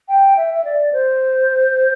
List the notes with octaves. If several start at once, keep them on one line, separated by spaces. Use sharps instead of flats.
G5
E5
E5
D5
C5